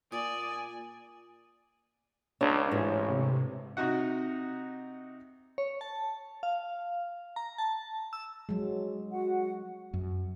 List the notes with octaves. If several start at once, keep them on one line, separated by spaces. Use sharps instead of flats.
A#2 D5 G#5 D#6
C#2 D4 C#5
A1 G#2
C3
C3 D#4 F#4 F#5
C#5
A5
F5
A#5
A5
E6
F#3 G#3
F#4 F#5
F#2